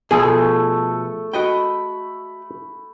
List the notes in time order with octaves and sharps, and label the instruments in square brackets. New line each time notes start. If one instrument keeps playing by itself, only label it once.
[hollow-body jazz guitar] B2 F3 [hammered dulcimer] A3 A4 [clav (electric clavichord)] G#4
[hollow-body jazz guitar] F#4 D#5 G5 [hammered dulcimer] B5